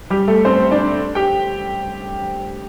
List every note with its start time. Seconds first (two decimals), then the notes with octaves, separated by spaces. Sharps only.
0.10 G3 G4
0.28 A3 A4
0.45 C4 C5
0.71 D4 D5
1.15 G4 G5